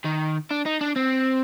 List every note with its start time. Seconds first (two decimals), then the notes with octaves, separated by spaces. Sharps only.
0.05 D#3
0.51 D4
0.66 D#4
0.81 D4
0.96 C4